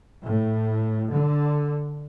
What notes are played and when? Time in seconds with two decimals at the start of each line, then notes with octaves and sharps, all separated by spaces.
0.22 A2
1.12 D3